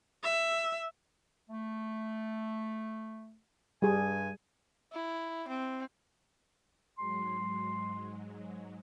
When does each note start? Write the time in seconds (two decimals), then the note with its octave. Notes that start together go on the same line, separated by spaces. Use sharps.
0.24 E5
1.50 A3
3.82 G2 G3 G#4 G#5
4.93 E4
5.48 C4
6.98 G#2 F#3 G#3 C6